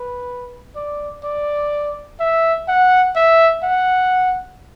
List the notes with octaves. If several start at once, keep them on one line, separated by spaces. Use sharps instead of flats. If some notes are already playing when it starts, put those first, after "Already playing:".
Already playing: B4
D5
D5
E5
F#5
E5
F#5